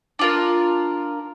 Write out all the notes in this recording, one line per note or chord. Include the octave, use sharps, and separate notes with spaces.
D4 F4 A#4